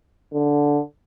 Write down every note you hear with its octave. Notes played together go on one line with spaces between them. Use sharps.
D3